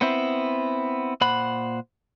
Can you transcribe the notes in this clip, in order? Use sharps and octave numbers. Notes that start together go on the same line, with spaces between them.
B3 C4 E4
A#2 C5 F#5 B5